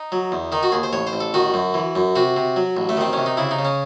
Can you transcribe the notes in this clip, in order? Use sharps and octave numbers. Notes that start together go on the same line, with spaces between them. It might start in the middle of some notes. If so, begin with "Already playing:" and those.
Already playing: D#4
F#3
E2
D#3 D#4
F#4
D#2 G#4
C5
A1 C#5
C5
A1
A4
D#3 F#4
F#2
E3
F#2
C3 F#4
C3
F#3
A1
A3
D#3 C4
C3 C#4
D#4
C#3 E4
D#4
C#3
C#4